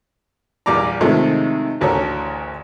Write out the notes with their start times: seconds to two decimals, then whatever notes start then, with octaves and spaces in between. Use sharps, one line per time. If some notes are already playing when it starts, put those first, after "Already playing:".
0.66 A#1 E2 G3 D5 A#5
1.01 A2 C3 D#3 F3 G#3 A3
1.81 A1 D2 A4 A#4 C#5